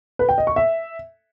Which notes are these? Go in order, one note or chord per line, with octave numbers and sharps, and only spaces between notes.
B4
G5
D#5
C#6
E5